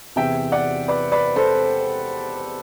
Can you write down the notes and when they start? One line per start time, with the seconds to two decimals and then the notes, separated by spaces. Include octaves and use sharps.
0.16 E2 C3 E3 E5 G5
0.52 D5 F#5
0.88 B4 D5
1.12 B4 D5
1.36 A4 C5